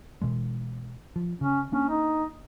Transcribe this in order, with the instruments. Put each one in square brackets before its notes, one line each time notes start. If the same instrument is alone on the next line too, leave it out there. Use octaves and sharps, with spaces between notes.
[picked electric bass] B2 E3 G#3
F3
[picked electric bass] C#3 [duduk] C#4
[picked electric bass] A#3 D4 [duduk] C#4
[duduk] D#4